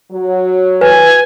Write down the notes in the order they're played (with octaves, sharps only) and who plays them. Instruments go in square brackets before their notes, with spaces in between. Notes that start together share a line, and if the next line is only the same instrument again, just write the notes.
[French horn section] F#3
[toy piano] B4 [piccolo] G#5